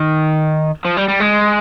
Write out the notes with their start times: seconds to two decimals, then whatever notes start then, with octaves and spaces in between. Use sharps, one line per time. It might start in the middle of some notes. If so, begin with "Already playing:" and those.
Already playing: D#3
0.85 F3
0.97 G3
1.08 G3
1.20 G#3